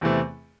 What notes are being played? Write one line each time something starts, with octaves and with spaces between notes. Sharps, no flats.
E2 C3 E3 A3 C4